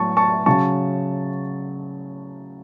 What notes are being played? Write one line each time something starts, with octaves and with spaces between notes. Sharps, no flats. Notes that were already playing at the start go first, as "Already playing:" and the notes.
Already playing: A2 F#3 A5 C#6
A5 C#6
C#3 F#3 A5 C#6